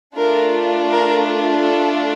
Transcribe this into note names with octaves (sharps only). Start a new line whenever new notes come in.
A3 D4 F4 A#4
A#4
A4